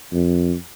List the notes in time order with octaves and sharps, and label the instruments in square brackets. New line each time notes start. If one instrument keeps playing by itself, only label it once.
[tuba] F2